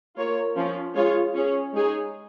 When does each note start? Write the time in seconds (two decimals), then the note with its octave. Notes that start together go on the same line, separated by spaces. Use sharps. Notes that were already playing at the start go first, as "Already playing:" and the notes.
0.16 A#3 F4 A#4 C#5
0.55 F3 C#4 F4
0.95 G#3 F4 G#4 C#5
1.34 C#4 G#4 C#5
1.74 G#3 D#4 G#4 C#5